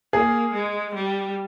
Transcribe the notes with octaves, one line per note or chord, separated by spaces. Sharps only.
A#3 G#4
G#3
G3